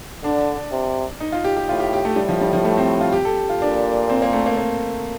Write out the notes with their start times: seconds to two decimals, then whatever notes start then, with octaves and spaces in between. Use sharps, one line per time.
0.23 D3 D4
0.72 C3
1.20 D#4
1.32 F4
1.44 G4
1.57 G4
1.69 A2 F4
1.80 G4
1.93 G4
2.05 A3
2.16 A2 G3
2.29 F3
2.41 G3
2.53 F3
2.65 A3
2.77 C4
3.01 F4
3.13 G4
3.25 A4
3.50 F4
3.61 A#2 D4
4.09 C4
4.22 A#3
4.33 A3
4.46 A#3
4.57 A#3